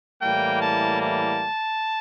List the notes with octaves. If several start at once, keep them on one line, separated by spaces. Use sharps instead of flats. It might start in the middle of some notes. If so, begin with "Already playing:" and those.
A2 E3 G3 A#3 G5
A5
A5